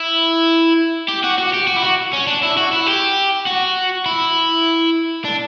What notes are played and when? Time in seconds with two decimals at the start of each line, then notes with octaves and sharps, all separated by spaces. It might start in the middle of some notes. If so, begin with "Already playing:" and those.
Already playing: E4
1.08 G4
1.24 F#4
1.38 F#4
1.54 G4
1.67 F#4
1.77 E4
1.83 F#4
2.13 C#4
2.27 D4
2.43 E4
2.57 F#4
2.73 E4
2.86 G4
3.47 F#4
4.06 E4
5.25 D4